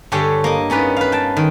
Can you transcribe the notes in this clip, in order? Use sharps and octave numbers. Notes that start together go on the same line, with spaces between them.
G2 D3 G4 A4 C#5 G#5
A#3 D#5
B3 C#4 D#4 B4 D5
B4 F5
G5 A5
D#3